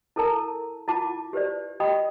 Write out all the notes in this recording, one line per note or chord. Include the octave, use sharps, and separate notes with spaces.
E4 A4 A#4 A5 A#5
E4 F4 F#5 A5 D6
G4 B4 C5 D5
G4 D#5 G5 B5 D#6